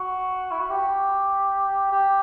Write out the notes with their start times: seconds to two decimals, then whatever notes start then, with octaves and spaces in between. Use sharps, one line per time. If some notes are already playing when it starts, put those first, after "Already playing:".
Already playing: F#4
0.51 E4
0.60 F#4
0.70 G4
1.91 G4